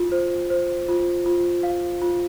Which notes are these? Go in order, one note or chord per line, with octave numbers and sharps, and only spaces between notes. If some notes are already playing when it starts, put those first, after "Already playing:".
Already playing: F4
C5
C5
F4
F4
F5
F4